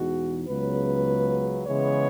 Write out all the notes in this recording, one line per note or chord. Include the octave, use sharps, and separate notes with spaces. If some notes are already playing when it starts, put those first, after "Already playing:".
Already playing: E2 B2 G#3 D#4 F#4
C#2 C#3 F#3 B3 B4
C#3 E3 G#3 B3 C#5